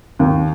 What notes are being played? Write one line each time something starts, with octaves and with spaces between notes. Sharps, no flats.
D#2